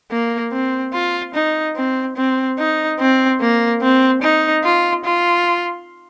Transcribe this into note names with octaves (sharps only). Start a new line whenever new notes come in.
A#3
C4
F4
D#4
C4
C4
D#4
C4
A#3
C4
D#4
F4
F4